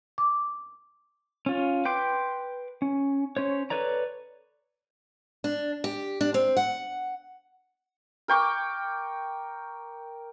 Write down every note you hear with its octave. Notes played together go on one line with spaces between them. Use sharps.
D6
C#4 F4
B4 G5 C6 D6
C#4
C#4 C5 C#5
A4 B4 C#5 D5 A#5
D4
G4
D4
C4
F#5
A#4 G5 C#6 D6